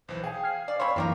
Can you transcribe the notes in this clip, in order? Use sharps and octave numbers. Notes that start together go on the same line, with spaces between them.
B1 E3 C5
G#4 F5 G5 G#5
F6 G#6 C7
D5 F5
C4 C#5 B5 C6
F#2 E3 A#3 D4 G4 A#4